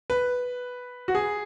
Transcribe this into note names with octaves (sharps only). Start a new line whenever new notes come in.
B4
F#4
G#4